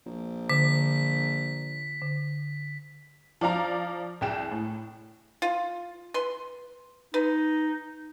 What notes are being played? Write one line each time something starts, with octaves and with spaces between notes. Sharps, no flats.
A#1
D3 B6
D3
F3 D5 F5 A#5
C2 G#4 G5 E7
A2
F4
B4 C6
D#4 B4